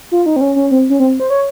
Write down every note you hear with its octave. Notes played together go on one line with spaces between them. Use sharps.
F4
D#4
C4
C#4
C#4
C4
C#4
C4
C5
C#5